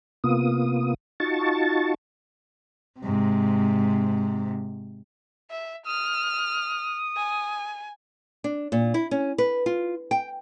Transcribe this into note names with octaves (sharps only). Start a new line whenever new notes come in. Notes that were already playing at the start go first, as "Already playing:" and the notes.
C3 A#3 B3 F4 D#6
D#4 F4 F#4 A5 C#6 A6
G#2 C3
E5
D#6 F6
G#5
D4
A#2
E4
C#4
B4
F4
G5